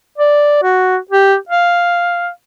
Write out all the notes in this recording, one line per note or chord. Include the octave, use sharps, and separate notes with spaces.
D5
F#4
G4
F5